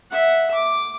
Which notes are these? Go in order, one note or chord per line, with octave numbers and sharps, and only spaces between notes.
E5 F#5
D6